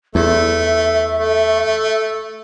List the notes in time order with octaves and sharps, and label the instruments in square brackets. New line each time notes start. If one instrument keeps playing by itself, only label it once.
[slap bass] E2 [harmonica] A3 [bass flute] E5
[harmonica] A3